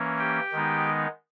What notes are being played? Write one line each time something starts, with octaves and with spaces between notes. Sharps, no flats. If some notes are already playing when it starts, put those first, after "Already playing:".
Already playing: E3 A#3 C#4
G4 G5
D#3 G#3 B3 D#4